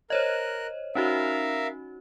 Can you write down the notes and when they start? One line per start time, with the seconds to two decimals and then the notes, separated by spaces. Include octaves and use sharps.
0.10 A#4 C5 C#5 D#5 F#6
0.95 C#4 D#4 F#4 A#4 E5 F5